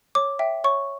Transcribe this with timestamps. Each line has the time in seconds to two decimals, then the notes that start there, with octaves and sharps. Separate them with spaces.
0.15 C#5 D6
0.39 E5 G5
0.64 C#5 C#6